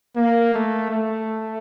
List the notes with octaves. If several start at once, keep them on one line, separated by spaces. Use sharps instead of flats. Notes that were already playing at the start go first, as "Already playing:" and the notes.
A#3
A3
A3